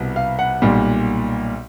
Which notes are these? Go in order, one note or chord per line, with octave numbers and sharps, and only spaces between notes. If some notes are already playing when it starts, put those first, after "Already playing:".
Already playing: C2 B2 G3
F5
F#5
B1 A#2 G3